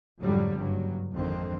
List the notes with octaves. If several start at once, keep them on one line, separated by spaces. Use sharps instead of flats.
F2 G#2 D3 F#3 G3
F#1 G2 F#3
G#1 F2 D3 D#3 C4